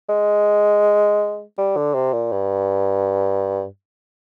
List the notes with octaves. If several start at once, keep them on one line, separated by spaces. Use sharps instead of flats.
G#3
G3
D3
C3
A#2
G2